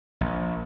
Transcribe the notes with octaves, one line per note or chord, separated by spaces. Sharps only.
A#1